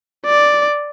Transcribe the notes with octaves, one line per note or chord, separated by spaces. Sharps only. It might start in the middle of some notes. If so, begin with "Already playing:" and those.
D5